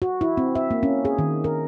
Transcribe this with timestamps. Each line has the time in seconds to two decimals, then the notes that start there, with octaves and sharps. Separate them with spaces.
0.02 F#4
0.21 E4
0.37 C4
0.55 E5
0.71 A#3
0.83 C#4
1.05 G#4
1.19 D#3
1.44 A#4